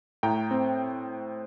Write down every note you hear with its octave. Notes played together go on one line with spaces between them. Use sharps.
A2 G5 A#5
C4